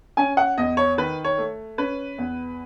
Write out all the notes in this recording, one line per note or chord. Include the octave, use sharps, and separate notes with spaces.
C#4 G#5
F#5
E2 D#5
C#5
D#3 B4
C#5
A3
C#4 B4
E2